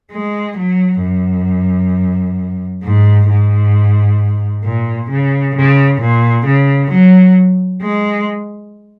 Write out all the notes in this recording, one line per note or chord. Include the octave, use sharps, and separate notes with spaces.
G#3
F#3
F#2
G#2
G#2
A#2
C#3
C#3
A#2
C#3
F#3
G#3